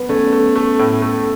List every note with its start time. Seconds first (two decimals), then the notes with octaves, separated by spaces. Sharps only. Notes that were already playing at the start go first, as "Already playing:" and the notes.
Already playing: B3
0.09 A3 C#4
0.32 A3
0.55 A3
0.79 A2
1.02 A3